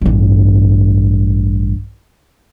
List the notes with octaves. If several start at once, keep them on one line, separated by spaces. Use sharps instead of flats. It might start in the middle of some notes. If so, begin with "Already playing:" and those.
A1 G2